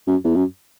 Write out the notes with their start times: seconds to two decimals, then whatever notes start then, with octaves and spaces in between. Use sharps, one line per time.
0.07 F#2
0.24 E2
0.35 F#2